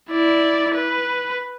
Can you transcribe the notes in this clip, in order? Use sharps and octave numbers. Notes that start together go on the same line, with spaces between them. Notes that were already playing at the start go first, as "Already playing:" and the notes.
E4 D5
B4